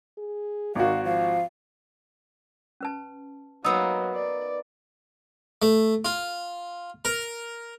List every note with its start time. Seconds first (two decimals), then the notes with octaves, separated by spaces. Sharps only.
0.18 G#4
0.75 G#1 D#3 F#4 F5
1.05 F3 F5
2.81 C#4 B4 A5
3.64 F#3 A#3 B3 D#4 D#5 D#6 E6
4.15 D5
5.62 A3
6.05 F4
7.05 A#4